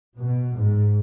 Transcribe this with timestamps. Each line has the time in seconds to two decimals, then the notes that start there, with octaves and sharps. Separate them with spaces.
0.20 B2
0.58 G#2